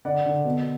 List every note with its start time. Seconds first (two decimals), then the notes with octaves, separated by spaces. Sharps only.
0.05 D3 D5 F#5
0.26 D3
0.45 B2